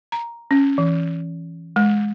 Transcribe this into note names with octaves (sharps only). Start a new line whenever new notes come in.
A#5
C#4
E3
G#3